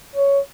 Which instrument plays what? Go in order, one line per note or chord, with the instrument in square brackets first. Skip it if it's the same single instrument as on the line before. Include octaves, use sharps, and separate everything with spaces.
[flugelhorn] C#5